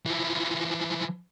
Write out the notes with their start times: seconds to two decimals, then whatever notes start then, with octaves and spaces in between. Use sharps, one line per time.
0.06 E3 F3